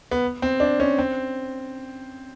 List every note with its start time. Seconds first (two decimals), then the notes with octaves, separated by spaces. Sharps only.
0.11 B3
0.42 C4
0.60 D4
0.80 C#4
0.98 C4